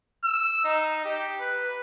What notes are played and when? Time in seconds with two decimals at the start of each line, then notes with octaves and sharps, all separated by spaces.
0.24 E6
0.64 D#4
1.05 G4
1.40 B4